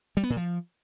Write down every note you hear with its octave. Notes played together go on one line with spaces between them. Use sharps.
G3
B3
A#2
F3